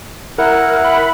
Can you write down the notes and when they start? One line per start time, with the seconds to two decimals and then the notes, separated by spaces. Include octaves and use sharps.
0.38 E4 A#4 F#5
0.84 B5